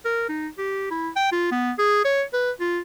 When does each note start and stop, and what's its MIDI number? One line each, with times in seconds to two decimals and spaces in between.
0.05 0.27 70
0.29 0.48 63
0.58 0.87 67
0.91 1.09 64
1.16 1.31 79
1.32 1.48 65
1.51 1.72 59
1.78 2.01 68
2.05 2.23 73
2.33 2.51 71
2.60 2.80 65